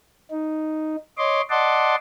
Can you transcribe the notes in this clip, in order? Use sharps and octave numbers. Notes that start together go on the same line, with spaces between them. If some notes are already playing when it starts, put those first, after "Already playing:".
D#4
C#5 D#5 C6 D6
D5 D#5 F#5 A5 C6 D6